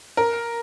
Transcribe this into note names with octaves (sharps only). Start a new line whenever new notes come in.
A#4